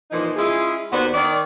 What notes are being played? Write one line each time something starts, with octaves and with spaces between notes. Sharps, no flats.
A#2 E3 F3 D#4
G#3 C#4 E4 F4 G#4
D#2 B3 F#4 C5 D5 F#5
D#3 D5